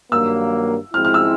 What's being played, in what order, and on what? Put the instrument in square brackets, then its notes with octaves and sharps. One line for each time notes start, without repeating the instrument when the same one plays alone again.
[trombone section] G2 D#3 F#3 A#3 [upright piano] E6
[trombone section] F3 G#3 C4 E4 [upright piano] F6
[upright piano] F6
E6